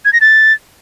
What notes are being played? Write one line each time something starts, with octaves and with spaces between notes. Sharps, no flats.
G#6
A#6
A6